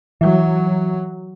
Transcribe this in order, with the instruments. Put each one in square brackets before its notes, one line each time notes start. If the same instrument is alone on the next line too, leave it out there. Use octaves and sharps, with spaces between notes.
[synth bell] E3 [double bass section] F#3